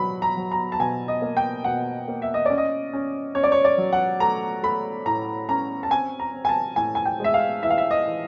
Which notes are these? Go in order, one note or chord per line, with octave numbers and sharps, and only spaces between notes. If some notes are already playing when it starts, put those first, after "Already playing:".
Already playing: B2 F#3 B5
A#5
F#3
A#5
A5
B2 G#5
D#5
A#3
G5
B2 F#5
A#3
E5
D#5
C#4 D5
D#5
C#4
C#4 C#5
D5
C#5
D5
F#3
F#5
A3 A#5
A3 B5
A2 A#5
C#4 A#5
A5
C4 G#5
A#5
C4
G#5
A5
A2 G#5
G#5
G5
G#3 E5
F5
E3 E5
F5
E5
D#5
E3